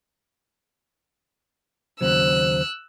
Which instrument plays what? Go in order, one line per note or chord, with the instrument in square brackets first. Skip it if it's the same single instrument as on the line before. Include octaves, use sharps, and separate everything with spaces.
[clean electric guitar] D#2 C#3 F#3 [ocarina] C5 [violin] E6 F#6